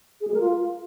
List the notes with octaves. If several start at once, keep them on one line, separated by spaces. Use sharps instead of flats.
G#4
G#3
A#4
F4